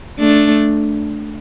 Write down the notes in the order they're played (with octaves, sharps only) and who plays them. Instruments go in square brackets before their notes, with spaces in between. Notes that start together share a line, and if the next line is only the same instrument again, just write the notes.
[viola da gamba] A3 D4